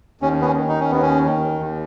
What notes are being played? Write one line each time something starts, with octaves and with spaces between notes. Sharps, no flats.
D#2 C#4
B3
C#4
D#3
D#4
C#4
D#2 B3
C#4
D#3
D#2